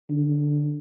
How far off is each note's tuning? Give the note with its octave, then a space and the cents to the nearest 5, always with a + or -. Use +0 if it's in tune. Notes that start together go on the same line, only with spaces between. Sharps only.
D3 +0